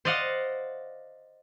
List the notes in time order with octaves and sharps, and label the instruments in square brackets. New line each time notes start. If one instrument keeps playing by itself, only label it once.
[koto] C5 D5 D#5 F5 F#5